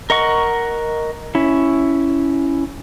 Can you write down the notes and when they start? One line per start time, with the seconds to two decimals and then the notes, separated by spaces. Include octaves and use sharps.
0.10 A#4 D#5 F#5 C#6
1.35 C#4 E4